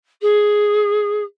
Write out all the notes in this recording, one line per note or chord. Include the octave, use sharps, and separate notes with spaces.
G#4